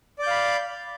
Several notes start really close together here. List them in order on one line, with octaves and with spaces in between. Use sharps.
D5 G6 F5 B5